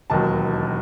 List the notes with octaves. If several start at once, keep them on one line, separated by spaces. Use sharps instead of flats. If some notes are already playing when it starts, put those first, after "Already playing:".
E1 D#2 D#3 F#3 A5